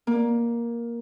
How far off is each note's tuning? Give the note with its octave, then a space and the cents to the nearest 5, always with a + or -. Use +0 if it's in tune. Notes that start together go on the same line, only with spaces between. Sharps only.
A#3 +10